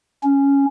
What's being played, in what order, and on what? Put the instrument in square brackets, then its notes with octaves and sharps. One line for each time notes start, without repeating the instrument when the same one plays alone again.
[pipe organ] C#4